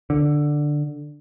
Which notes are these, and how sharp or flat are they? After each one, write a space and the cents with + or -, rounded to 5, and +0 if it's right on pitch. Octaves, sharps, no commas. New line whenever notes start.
D3 +5